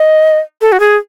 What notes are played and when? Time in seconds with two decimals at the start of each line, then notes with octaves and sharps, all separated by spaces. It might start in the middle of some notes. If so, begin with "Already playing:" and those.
Already playing: D#5
0.61 A4
0.72 F#4
0.80 G#4